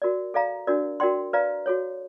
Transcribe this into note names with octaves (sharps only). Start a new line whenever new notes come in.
F#4 A#4 D5
A4 D5 F5 A#5
D4 F#4 A#4 D5
F#4 A#4 D5 G5 C6
B4 D5 F5 A#5
F#4 A4 C#5